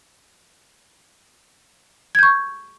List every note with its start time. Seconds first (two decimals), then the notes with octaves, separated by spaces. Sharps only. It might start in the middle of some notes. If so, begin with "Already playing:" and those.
2.15 G#6
2.19 G6
2.23 C#6